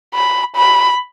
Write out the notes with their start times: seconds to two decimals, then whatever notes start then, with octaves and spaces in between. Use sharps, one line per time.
0.14 B5
0.56 B5